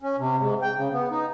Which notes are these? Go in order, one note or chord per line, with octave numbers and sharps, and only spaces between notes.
C#4
C3
G#2
G5
C#3
B3
D#4